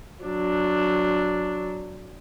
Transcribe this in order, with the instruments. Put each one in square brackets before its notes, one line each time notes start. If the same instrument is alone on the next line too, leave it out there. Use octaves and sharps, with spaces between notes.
[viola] F#3 D4